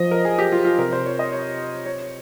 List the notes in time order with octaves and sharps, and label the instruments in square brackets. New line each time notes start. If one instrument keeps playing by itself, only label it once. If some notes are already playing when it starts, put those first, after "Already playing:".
Already playing: [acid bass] F3 [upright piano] D#5
[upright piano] A#4
G#4
G4
F4
F4
[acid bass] C3 [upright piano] A#4
[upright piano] C5
C#5
D#5
C#5
C#5